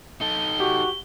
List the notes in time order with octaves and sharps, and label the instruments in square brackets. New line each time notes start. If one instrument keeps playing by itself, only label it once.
[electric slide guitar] D#4 A4 [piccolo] G7
[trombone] F#4 [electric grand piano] G4